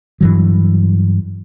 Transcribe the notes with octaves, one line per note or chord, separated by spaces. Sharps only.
G2 E3 F#3